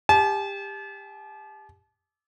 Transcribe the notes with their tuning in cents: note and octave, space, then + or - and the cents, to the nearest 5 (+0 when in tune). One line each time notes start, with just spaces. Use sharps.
G4 +25 A5 -40